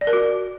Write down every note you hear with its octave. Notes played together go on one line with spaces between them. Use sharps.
D5
A#4
F#4